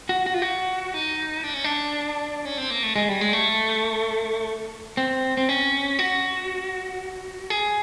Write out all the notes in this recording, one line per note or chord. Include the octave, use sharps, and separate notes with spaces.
F#4
F#4
F4
F#4
D#4
D4
C#4
D4
C#4
C4
A#3
A3
G#3
G3
G#3
A3
C4
C4
C#4
F#4
G#4